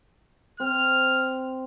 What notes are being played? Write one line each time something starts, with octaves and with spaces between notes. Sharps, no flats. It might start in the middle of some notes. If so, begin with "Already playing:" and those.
C4 F6